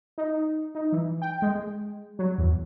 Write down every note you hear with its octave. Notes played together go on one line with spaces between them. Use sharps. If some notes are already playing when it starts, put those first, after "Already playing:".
D#4
D#4
E3
G5
G#3
F#3
E2